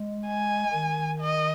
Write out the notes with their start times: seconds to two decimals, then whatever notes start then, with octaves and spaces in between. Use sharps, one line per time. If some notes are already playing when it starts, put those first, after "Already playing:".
Already playing: G#3
0.27 G#5
0.73 D#3
1.20 D#5